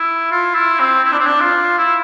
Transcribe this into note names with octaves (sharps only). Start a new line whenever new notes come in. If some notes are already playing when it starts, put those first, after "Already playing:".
Already playing: E4
F4
E4
C4
E4
D4
C4
D4
F4
E4